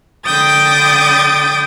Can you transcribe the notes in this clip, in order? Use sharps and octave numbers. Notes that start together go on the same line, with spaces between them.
D3 G5 D6 D#6 G6 A6